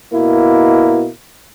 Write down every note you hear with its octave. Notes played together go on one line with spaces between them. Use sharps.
B2 A#3 E4